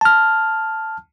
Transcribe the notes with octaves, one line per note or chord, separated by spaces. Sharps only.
A5 F6